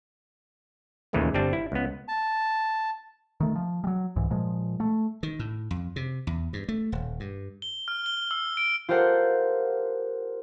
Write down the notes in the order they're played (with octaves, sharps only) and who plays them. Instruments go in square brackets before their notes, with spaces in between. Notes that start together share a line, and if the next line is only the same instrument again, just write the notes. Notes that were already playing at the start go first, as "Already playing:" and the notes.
[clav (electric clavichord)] D#2 A#2 C#3 E3 G#3 A3
G1 G3 C4 D4 A5
E4
C#2 B3
[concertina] A5
[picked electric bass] D#3 A3
F3
F#3 G3
C2 G#2 E3
A#2 F3 G#3
A3
[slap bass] D#3
A2
F2
C3
E2
G2
A3
D#1
G2
[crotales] G7
F6
G7
E6
D7
[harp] F4 G4 A4 A#4 C5 F#5